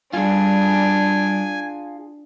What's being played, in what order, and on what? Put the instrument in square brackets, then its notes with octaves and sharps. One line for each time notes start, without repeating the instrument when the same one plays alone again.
[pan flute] G3 [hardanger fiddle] D4 [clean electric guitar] F4 G#4 [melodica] G#5